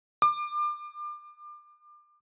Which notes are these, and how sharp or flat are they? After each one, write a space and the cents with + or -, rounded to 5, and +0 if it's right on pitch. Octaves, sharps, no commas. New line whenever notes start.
D6 +30